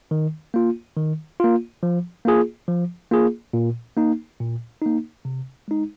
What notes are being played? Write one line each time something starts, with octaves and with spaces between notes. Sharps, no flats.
D#3
A#3 F4
D#3
A#3 F4
F3
A#3 F4 G#4
F3
A#3 F4 G#4
A#2
A#3 D#4
A#2
A#3 D#4
C3
G#3 D#4